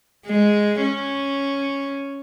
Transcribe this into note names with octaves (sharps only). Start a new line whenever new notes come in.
G#3
C#4